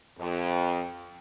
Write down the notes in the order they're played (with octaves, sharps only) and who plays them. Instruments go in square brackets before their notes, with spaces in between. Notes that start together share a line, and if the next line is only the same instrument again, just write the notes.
[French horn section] F2